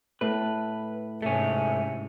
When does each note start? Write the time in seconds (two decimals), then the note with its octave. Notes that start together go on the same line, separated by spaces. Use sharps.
0.21 A2 B4
1.22 G#2 C3 A3 C#4